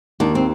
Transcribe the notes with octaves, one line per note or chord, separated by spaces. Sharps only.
D#2 D4
C4